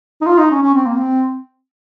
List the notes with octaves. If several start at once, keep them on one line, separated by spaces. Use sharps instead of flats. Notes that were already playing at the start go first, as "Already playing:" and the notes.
D#4
F4
D#4
C#4
C#4
C4
A#3
C4